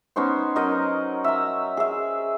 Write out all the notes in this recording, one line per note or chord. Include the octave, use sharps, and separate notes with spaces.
B3 C#4 D#4 C5
F#3 D#4 A#4 D#5
E5 A#5
G#4 E5